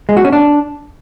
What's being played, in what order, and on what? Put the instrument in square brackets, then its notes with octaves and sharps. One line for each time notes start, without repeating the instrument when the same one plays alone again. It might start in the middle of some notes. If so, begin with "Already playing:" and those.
[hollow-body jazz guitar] G#3
F#4
C#4
D4